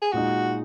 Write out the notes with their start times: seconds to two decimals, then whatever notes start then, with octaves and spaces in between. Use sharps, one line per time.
0.02 G#4
0.12 A#2 G#3 D#4 F#4